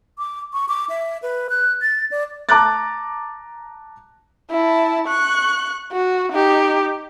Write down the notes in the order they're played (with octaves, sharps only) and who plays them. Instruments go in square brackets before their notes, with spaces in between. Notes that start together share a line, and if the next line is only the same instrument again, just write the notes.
[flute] D6
C#6
D6
E5
B4
F#6
A6
D5
[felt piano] A5 A#5 D6 F#6 A6
[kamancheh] E4 A5
C#6 F#6
F#4
D#4 G4